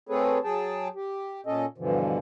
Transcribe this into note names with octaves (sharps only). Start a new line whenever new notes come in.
A3 C4 G#4 A4 B4 C#5
F#3 G#4 G5 A5
G4
A#2 C#4 A4 D#5
G2 B2 D3 E3 F3